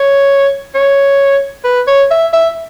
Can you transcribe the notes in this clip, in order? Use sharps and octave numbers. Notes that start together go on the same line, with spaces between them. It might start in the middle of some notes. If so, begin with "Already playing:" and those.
Already playing: C#5
C#5
B4
C#5
E5
E5